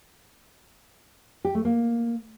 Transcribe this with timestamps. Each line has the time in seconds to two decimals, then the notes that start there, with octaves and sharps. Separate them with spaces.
1.45 G4
1.55 A3
1.65 A#3